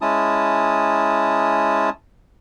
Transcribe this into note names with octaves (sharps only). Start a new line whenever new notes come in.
G#3 C#4 E4 A5 D#6